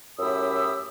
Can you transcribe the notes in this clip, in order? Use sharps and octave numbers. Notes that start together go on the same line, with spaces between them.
F#2 A2 G4 B5 D#6 E6